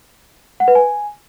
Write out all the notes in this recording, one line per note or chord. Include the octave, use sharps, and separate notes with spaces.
F#5
B4
G#5